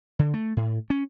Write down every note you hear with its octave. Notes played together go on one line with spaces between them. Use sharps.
D3
A3
A2
C#4